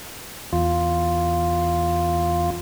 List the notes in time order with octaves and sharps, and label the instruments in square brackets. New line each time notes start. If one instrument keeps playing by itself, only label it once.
[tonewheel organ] E2 F4